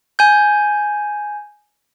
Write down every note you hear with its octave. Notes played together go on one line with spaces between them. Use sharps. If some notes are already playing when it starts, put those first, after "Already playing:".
G#5 G6